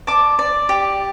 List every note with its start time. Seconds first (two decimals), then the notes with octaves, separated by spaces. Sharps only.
0.07 D5 A5 D6
0.39 D5
0.69 G4